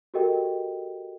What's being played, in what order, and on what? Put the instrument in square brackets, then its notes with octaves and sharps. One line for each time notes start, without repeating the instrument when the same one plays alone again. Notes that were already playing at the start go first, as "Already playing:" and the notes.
[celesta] F#4 G4 A4 A#4 D#5 G5